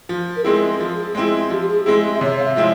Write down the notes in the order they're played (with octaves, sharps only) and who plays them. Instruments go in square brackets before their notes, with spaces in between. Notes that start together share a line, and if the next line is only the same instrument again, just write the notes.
[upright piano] F3
[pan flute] A#4
[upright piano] G#3 C4 E4 [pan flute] G#4
[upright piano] F3
G#3 C4 E4
[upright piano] F3 [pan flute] G4
[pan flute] G4
G#4
[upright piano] G#3 C4 E4 [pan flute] G#4
[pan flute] E5
[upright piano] C3 [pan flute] C#5
[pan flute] F5
E5
[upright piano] F3 G#3 C4 E4